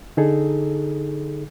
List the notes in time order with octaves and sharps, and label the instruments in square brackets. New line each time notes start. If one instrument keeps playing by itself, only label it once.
[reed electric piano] D3 D#4 G#4 A4